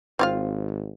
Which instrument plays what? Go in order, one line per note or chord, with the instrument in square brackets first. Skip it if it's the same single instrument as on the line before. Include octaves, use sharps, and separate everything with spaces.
[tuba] G#1 [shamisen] C4 F4 F5